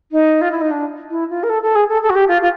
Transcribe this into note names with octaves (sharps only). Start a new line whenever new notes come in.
D#4
F4
E4
D#4
D4
E4
F4
A#4
A4
A4
G#4
A4
A4
F#4
G4
F4
F4